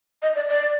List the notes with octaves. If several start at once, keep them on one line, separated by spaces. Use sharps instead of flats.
D#5
D5
D5